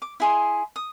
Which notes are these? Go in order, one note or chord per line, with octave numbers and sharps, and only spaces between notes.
D6
E4 G#4 C6
D#6